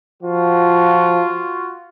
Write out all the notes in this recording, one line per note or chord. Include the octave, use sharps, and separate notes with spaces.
F3 F4 F#4